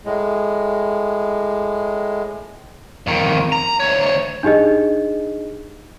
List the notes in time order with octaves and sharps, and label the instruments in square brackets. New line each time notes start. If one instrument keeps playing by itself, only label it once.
[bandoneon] A2 G#3
[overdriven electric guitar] F2 D#3
A#5
D2 C#5
[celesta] D4 D#4 G4 G#4 D#5